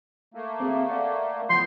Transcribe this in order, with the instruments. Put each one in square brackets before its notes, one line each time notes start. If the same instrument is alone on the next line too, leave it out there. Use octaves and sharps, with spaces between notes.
[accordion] A3 A#3
[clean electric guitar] C4 G#4
D5 F#5
[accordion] A2 B3 G6 [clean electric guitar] F3 A5 B5 [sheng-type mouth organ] C6